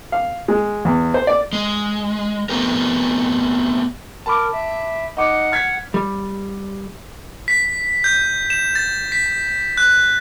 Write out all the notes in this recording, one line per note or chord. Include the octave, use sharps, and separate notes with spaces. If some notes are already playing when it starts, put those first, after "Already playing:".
F5
G#3
E2
C5
D5
G#3
A3 B3 C4 G4 A#4
A#4 A5 B5 D6
E5
D#4 F#5 D6
F6 G#6 B6
G3
B6
G6
E7
A6
B6
F#6